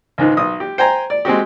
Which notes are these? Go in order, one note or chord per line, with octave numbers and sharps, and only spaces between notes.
C#2 G#2 D#3
B1 D#6
G4
C5 G5 G#5 A#5
D5
G#3 C4 F#4 G4